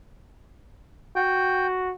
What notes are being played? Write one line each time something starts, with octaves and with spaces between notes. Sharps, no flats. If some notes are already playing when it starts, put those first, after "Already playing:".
F#4 G5